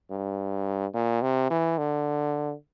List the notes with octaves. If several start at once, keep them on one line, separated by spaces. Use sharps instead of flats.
G2
A#2
C3
E3
D3